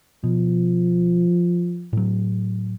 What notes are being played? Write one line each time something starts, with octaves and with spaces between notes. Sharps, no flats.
B2 F3
A2 F#3